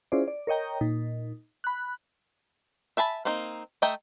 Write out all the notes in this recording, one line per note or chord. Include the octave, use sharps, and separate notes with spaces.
C#4 E4 F4 G#4 C5 D5
D5
A#4 C#5 D#5 G5 A#5
A#2 D#4
B5 F#6
E5 G#5 A5 B5
A#3 C4 D#4
A3 D#5 E5 G5 A#5